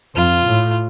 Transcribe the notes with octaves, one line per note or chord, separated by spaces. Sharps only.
F2 F4
A2